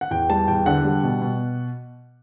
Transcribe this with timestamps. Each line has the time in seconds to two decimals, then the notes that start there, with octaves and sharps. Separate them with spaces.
0.01 F#5
0.11 E2 G5
0.30 G3 A5
0.48 E2 G5
0.66 D3 F#5
0.84 G3
1.03 B2
1.21 B2